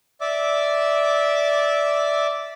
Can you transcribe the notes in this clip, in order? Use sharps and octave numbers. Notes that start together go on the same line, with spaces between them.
D5 E5 D6 E6